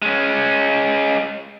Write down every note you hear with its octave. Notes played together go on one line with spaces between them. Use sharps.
G#3 C#4